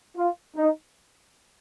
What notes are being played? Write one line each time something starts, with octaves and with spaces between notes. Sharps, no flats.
F4
D#4